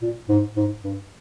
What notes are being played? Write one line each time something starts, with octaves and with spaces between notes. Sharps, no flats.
A#2
G#2
G#2
G2